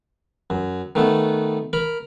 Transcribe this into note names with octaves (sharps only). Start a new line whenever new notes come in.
F#2
D#3 A3 B3
A#4 B5